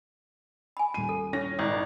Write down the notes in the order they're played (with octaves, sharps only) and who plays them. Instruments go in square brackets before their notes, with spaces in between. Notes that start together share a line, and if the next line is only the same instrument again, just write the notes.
[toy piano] G#5 B5
[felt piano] D#1 D#7
[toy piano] A4
[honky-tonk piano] C#4 A#6
[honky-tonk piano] G#1 [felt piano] E4 D5 A#5